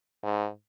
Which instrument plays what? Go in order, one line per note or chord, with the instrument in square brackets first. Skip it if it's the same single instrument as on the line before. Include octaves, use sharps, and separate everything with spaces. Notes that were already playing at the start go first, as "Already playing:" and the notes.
[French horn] G#2